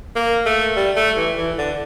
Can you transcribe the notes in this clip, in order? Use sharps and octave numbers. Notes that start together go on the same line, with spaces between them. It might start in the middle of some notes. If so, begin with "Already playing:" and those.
A#3
A3
G3
A3
E3
E3
D3